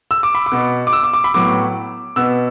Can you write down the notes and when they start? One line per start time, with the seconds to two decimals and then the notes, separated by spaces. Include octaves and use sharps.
0.11 E6
0.23 D6
0.35 B5
0.46 D6
0.52 B2 B3
0.87 D6
0.93 E6
1.03 D6
1.13 D6
1.24 B5
1.34 A2 F#3 B3 D6
2.16 B2 B3 E6